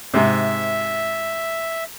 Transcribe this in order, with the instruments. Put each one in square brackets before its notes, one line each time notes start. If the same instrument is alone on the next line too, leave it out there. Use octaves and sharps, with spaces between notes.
[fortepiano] G#2 C3 [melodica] E5